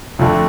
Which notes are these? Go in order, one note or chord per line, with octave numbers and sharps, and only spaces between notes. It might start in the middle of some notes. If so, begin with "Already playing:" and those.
F2 D3 F3 A3